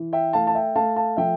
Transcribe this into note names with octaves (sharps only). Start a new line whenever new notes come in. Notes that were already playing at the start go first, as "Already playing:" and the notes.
Already playing: E3
E5 G5
A3 F5 A5
A5
E5 G5
A3 F5 A5
F5 A5
F3 E5 G5